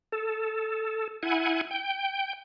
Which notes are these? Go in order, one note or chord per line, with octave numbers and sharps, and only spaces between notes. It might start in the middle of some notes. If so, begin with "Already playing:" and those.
A4
E4 F#5 G#5
G5